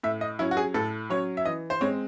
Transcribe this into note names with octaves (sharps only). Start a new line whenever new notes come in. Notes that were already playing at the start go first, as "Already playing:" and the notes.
A2 E5
D#5
F#3 C#4 E4
F#4
G#4
A2 A4
F#3 C#4 C#5
E5
E3 D#5
C5
G#3 C4 C#5